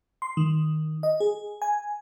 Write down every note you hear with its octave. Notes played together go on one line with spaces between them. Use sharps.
C6
D#3
D#5
G#4
G#5